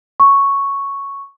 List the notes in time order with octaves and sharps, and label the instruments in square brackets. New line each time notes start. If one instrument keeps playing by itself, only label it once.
[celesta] C#6